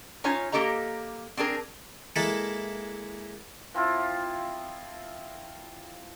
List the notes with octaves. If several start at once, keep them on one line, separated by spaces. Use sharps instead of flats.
C#4 D#4 F4 C#5 G#5
A#3 F4 G4 A4 D#5 A#5
C4 D4 G#4 A#4
G#3 A#3 E4 A4
F3 C4 E4 F4